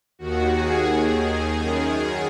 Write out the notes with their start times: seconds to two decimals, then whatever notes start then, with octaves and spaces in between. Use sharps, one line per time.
0.19 D#2 D#3 F#4
0.52 G#4
0.85 D#2 D#3
1.53 F#2 D#3